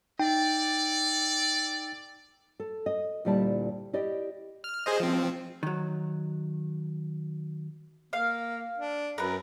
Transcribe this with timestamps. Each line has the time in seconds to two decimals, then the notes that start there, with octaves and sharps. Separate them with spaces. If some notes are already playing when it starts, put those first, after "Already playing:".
0.19 D#4 A4 D5 G5
2.60 A4
2.86 D#5
3.25 D2 A#2 G3 E4 D5 A5
3.93 E4 G4 D5 D#5
4.64 F6
4.86 G#4 C5 D#5
5.00 F3 C4
5.63 D#3 F#3
8.13 A#3 F5
8.78 D4
9.18 F#2 A#4 B4